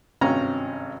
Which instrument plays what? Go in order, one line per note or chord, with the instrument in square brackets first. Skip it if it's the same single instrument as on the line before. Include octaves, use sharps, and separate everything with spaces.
[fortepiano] G#1 G2 C3 C#4 G5 A#5